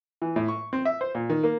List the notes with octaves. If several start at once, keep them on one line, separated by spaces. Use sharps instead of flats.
E3
A2
C#6
C4
E5
C5
A#2
D#3
A#3